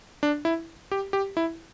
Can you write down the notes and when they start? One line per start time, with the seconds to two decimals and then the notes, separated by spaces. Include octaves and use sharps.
0.23 D4
0.45 E4
0.92 G4
1.13 G4
1.37 E4